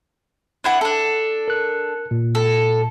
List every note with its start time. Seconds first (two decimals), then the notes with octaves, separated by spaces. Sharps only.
0.64 D4 E4 F#5
0.81 D4 A4
1.48 A#4 F#6
2.11 A#2
2.35 A4